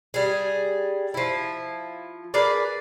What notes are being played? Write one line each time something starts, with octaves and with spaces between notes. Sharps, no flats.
G3 G#4
F3 E4
G#4 A#4 B4 D5